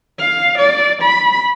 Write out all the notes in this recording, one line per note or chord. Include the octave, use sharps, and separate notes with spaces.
F5
D5
B5